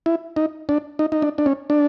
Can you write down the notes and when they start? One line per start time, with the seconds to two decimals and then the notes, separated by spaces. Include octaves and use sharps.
0.06 E4
0.36 D#4
0.69 D4
0.99 D#4
1.12 D#4
1.22 D4
1.38 D4
1.46 C#4
1.70 D4